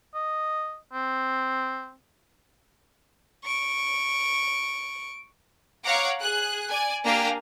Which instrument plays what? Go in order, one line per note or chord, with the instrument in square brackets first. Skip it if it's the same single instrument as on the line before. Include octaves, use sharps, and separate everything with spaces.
[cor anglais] D#5
C4
[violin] C#6 D7
[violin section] C#5 F5 F#5 A#5 D6
G#4 F#6
D5 G#5
A#3 D4 G4 F5 G#5 A#5